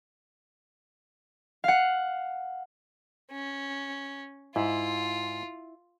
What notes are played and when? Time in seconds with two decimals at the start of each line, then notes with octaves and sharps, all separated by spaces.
1.64 F5 F#5
3.32 C#4
4.56 G#2 E4 F4